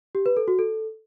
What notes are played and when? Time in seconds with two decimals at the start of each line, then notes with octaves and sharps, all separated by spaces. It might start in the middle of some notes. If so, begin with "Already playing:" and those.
0.15 G4
0.26 B4
0.37 A4
0.48 F#4
0.59 A4